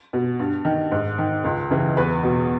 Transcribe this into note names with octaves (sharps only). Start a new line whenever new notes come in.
B2
G2
D#3
G#2
D#3
C#2
C#3 E3
E2 B4
B2